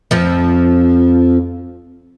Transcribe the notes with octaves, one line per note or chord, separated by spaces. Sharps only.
F2 F3